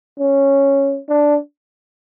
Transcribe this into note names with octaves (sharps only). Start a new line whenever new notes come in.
C#4
D4